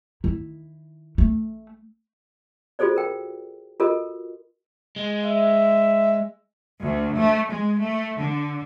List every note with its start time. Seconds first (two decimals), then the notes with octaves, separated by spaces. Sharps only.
0.24 D#3 E4
1.18 A3
2.79 F4 F#4 G#4 A4 C5 D5
2.96 A#4 G5
3.80 F4 F#4 A4 A#4 D#5
4.96 G#3
5.25 E5
6.81 D2
7.15 A3
7.49 G#3
7.80 A3
8.18 D3